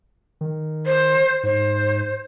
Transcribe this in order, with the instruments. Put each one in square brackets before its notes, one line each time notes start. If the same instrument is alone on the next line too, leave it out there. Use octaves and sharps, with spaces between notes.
[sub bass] D#3
[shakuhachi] C5
[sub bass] G#2 [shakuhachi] C5